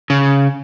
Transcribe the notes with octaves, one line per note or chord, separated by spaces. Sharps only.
C#3